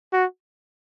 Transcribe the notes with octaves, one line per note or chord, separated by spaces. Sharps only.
F#4